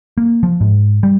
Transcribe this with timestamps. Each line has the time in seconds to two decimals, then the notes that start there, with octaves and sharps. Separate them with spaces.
0.17 A#3
0.43 F3
0.61 G#2
1.03 G3